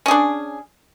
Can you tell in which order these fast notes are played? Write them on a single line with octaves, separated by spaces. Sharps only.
C#4 G#4 D4